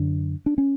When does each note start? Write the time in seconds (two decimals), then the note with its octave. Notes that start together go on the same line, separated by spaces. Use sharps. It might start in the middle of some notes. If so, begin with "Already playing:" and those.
Already playing: F#2 D3 D4
0.46 D4
0.58 C#4